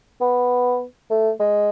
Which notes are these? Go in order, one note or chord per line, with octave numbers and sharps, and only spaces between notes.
B3
A3
G#3